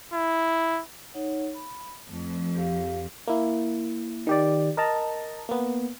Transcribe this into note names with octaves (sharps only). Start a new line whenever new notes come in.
E4
D#4 C#5 F#5
B5
F2 A3
G4 F5
A#3 E4
D#3 G4 D5
A#4 D#5 A5 A#5
A#3 B3